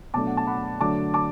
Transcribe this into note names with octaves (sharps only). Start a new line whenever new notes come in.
B2 F#3 A3 D4 A5 D6
F#5
A5
F#5 B5
D3 F#3 A3 D4 A5 D6
A5 D6